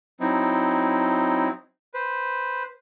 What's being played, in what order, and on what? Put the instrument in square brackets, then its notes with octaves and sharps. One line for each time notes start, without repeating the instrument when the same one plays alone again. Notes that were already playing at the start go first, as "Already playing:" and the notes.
[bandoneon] F#3 C4 D#4 E4
B4 C5